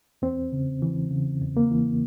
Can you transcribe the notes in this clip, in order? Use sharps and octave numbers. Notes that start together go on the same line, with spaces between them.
E2 C4
C#3
E3
C#3
E2
A#3
E3